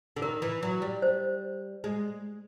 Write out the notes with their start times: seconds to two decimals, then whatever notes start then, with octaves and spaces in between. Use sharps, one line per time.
0.16 D3
0.22 D#3 A#4
0.42 E3
0.63 F#3
0.82 G3
1.02 C5
1.84 G#3